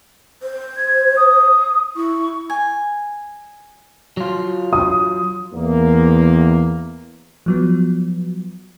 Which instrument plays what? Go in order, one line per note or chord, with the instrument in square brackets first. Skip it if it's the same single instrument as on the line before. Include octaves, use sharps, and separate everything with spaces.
[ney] C5
[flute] G#6
D#6
[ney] E4 [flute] C#6
[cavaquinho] G#5
[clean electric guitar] F#3 F4
[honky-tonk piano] D#6
[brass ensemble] E2 A#3
[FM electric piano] F3 F#3 B3